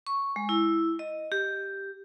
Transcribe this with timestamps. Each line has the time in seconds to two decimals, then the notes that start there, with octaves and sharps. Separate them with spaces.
0.07 C#6
0.36 G#3
0.49 E4
0.99 D#5
1.32 G4